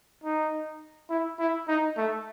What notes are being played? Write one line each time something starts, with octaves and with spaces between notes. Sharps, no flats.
D#4
E4
E4
D#4
A3